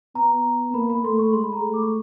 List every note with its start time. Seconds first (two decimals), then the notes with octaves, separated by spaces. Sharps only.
0.15 B3 A#5
0.74 A#3 B5
0.90 B5
1.04 A3 C6
1.19 C#6
1.33 G#3 C6
1.44 B5
1.53 A#5
1.63 A3
1.74 D6
1.83 C#6